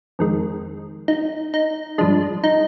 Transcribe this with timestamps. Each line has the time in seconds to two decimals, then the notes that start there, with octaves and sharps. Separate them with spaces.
0.19 F2 D#3 G#3
1.08 D#4
1.54 D#4
1.98 G2 F3 G#3 D4
2.44 D#4